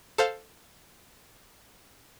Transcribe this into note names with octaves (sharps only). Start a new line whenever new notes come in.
A4 C5 F5